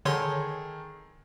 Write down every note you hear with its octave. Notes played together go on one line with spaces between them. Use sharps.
D3 D#3 G#4 A4 C#5 C6